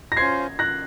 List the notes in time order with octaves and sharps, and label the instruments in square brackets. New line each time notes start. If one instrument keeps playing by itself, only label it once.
[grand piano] A#6
[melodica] C#4 F4 C5 [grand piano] G#6 C7
[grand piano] F#6 A#6